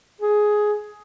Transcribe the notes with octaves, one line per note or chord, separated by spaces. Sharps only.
G#4